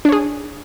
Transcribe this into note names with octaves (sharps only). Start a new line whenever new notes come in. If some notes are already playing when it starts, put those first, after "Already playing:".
D4 G#4 C#5